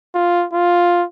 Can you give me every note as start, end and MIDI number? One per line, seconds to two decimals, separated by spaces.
0.14 0.45 65
0.53 1.05 65